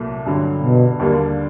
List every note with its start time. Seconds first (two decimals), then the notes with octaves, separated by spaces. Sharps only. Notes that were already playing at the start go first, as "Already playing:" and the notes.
Already playing: C2 A#2 F#3 A3
0.26 G2 D3 F#3
0.62 B2
0.99 D#2 D3 G3 A#3 D4